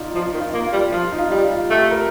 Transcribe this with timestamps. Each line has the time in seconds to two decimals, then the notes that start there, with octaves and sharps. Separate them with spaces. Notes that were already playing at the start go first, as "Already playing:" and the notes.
Already playing: D#4 F4 D5
0.15 F3 F4
0.34 D#3
0.40 F4
0.54 A#3
0.66 F4
0.72 G3
0.92 F3 F4
1.12 D#4
1.18 F4
1.31 G3
1.44 F4
1.70 A3 G4
1.91 A#4